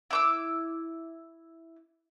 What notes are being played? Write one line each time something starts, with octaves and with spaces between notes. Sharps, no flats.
E4 D6 E6